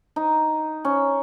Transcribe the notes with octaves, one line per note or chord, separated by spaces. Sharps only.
D#4
C#4